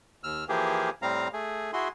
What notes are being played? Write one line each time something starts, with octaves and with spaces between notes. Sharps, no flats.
D#2 E6 F6
E3 F3 A#3 G4 G#4
A2 G3 C4 F5 A#5
A3 G#4
E4 F#4 G#4 C6